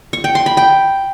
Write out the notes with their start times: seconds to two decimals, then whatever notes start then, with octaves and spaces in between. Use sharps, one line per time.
0.13 C#6
0.24 G5
0.35 C6
0.46 B5
0.57 G5